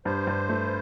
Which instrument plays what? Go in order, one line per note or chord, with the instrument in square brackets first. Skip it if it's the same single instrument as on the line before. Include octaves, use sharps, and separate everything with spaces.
[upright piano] G2 [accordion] C5
[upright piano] G2
A3